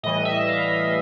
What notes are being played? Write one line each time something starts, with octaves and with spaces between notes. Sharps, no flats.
A2 E3 G3 D#5
E5
F5